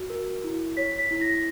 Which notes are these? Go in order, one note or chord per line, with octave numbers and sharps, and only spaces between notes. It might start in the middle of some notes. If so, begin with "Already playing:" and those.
Already playing: F#4
A#4
E4
C#5 B6
B6
E4
A#6